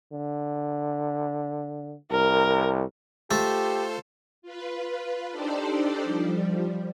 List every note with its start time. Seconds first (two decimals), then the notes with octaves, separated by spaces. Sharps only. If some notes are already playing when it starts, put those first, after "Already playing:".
0.12 D3
2.11 C2 A#4
3.31 A3 F4 G4 A4 C5
4.42 F4 B4
5.30 D4 D#4 G4 A4 C5 D5
6.03 F3 G3